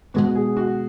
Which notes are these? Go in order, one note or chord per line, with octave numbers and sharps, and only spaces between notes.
B2 G#3 B3 F#4
G#4
F#4